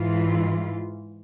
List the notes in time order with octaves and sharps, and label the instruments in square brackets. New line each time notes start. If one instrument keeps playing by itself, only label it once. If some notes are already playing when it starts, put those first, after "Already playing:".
Already playing: [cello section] G#2 E3 F4